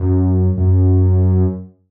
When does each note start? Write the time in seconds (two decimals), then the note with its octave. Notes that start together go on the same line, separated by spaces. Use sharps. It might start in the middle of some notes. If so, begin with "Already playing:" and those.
Already playing: F#2
0.57 F#2